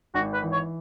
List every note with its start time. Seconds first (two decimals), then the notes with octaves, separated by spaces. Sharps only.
0.15 G#1 F#4
0.33 B4
0.43 E3
0.52 C#5